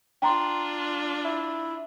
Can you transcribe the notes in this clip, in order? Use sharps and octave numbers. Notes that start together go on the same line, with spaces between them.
D4 F4 G5 A#5 C6
E4